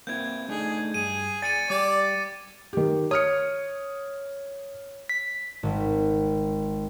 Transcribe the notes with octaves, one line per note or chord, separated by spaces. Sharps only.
A#3 C4 E4 G6 G#6
A3 D4 D#4 G#4
G2 G#4 D#7
D5 G#5 A6 C#7 D#7
G3 G4 D5 D6
D#3 G4
C#5 D#6 F6 C#7
B6
G#1